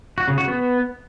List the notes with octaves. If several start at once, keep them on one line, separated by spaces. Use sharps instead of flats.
F#4
C#3
F#4
B3